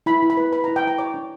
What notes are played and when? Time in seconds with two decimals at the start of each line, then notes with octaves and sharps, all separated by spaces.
0.06 E4 B5
0.22 E4
0.30 B5
0.37 B4
0.52 B4 B5
0.64 A#5
0.68 E4
0.76 G5
0.83 E4 A#5
0.98 C#5 D6
1.14 D4